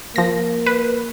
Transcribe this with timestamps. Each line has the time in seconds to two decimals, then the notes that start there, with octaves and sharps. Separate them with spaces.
0.16 F3 A#3 A#6
0.66 B4